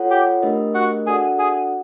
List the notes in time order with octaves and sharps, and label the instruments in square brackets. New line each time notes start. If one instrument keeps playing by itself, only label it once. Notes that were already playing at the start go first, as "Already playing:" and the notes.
Already playing: [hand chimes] F4 A4 C#5 F#5
[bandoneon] G4 G5
[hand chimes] A3 D4 G4 A#4 D#5
[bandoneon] F#4 F#5
[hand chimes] D4 F#4 A4 D5 F#5 [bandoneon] G#4 G#5
[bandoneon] G#4 G#5